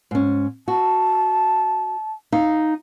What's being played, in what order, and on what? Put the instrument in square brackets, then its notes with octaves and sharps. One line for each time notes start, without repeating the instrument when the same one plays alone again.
[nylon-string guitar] G#2 C#4
[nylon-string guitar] F#4 [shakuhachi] A5
[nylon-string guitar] D#4 F5